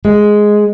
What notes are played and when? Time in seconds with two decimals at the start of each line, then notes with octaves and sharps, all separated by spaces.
0.05 G#3